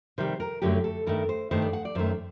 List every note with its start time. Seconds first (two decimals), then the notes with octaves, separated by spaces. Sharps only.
0.18 C3 D#3 G3 C5
0.40 A#4
0.62 F#2 D3 F#3 A3 G4
0.84 A4
1.06 G2 D#3 A3 A#4
1.29 C5
1.51 G2 D#3 A3 C5
1.62 D5
1.73 F#5
1.85 D5
1.95 F#2 D#3 A3 C5